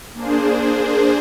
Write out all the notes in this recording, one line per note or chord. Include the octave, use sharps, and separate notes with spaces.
A#3 D4 G#4 C5